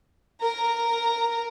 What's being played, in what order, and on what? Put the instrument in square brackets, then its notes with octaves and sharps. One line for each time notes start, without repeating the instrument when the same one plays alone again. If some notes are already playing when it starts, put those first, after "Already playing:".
[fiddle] A#4 A#5